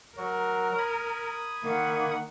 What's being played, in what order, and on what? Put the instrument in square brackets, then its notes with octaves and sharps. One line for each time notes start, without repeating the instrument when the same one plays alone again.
[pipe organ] F#3 F#4 [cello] A#4
[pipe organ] B5 D#6 G#6
[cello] D#3 F#5 [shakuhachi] A#3